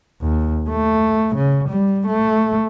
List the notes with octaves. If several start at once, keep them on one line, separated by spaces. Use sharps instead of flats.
D#2
A3
C#3
G3
A3